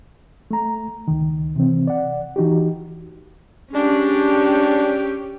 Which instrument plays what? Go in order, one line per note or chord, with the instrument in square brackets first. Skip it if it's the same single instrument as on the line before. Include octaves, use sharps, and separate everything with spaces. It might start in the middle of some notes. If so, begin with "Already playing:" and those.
[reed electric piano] A3 A#5
C#2 D#3
C3 E3 C4
D5 F#5
E3 D#4 F#4 G4
[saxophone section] G#3 D4 [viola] C#4 G4